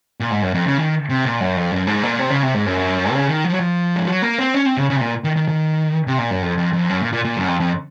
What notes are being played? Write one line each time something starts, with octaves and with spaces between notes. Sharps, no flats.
A#2
G#2
F#2
F2
C#3
D#3
C3
A#2
F#2
F2
F#2
G#2
A#2
C3
C#3
C3
G#2
F#2
C#3
D#3
F3
F#3
F3
G#3
F#3
A#3
C4
C#4
C4
C#3
C#3
C3
A#2
D#3
D#3
D#3
C3
A#2
F#2
F2
F2
F2
F#2
A#2
A#2
A#2
F#2
F2
F2